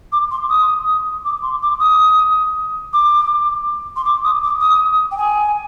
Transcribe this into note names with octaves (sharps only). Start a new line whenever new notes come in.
D6
C6
D#6
D6
C6
D6
D#6
D6
C6
D6
D#6
D6
D#6
G5
G#5